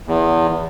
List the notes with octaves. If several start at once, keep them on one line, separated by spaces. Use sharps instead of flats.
E2